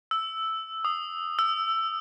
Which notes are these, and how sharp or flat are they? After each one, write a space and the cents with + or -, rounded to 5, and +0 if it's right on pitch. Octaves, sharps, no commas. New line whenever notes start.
E6 -5
D#6 -20
E6 +10